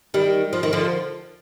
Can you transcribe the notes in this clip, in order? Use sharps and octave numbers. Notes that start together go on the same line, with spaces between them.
D#3 G3
F3
D#3
D3 F3